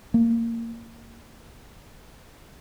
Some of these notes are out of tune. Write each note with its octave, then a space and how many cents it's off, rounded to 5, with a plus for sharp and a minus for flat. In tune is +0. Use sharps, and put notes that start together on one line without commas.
A#3 -15